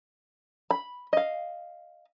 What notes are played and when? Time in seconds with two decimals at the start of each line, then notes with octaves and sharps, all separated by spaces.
0.71 B5
1.13 D#5 F5